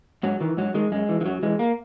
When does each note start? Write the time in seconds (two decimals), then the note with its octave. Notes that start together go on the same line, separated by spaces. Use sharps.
0.23 G#2 F#3
0.40 D#3 E3
0.57 G#2 F#3
0.74 D#3 G#3
0.92 F#2 G#3
1.09 E3
1.21 E3
1.25 F#2 F#3
1.43 E3 G#3
1.59 A#3